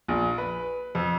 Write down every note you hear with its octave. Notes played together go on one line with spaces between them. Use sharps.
A#1
B4
F2